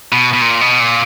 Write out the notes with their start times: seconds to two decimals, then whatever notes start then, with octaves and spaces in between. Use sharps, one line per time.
0.12 B2
0.33 B2
0.41 A#2
0.61 B2
0.80 A#2